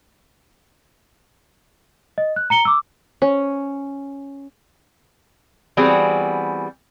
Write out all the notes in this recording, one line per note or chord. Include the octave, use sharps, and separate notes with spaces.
D#5
F#6
A#5 C#7 G7
D6 E6
C#4
E3 G3 B3 C4 F#4 G#4